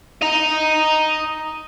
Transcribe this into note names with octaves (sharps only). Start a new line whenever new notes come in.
D#5 A#5